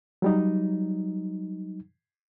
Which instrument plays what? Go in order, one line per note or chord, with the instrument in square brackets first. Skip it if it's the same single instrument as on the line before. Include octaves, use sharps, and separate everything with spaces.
[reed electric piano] F#3 G3 D#4